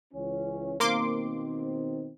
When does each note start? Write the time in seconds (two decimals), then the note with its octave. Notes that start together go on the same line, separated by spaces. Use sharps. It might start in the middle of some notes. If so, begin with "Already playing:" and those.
0.13 C#2 E3 C#4
0.80 B2 D#3 A#3 C4 C6 D6